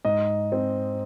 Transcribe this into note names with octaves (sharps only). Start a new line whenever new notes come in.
G#2 D#5
C4